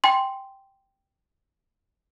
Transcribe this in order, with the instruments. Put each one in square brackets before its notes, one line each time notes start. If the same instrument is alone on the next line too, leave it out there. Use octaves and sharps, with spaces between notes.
[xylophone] G5 G#5 C6